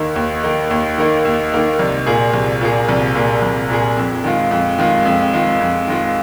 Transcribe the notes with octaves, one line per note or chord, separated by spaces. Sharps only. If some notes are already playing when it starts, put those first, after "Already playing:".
Already playing: D#2 D#3 A#3 D#4
D#2
D#3 A#3 D#4
D#2
D#3 A#3 D#4
D#2
D#3 A#3 D#4
C2
A#2 A#3 G#4
C2
A#2 A#3 G#4
C2
A#2 A#3 G#4
C2
A#2 A#3 G#4
F2
D#3 G#3 F4
F2
D#3 G#3 F4
F2
D#3 G#3 F4
F2
D#3 G#3 F4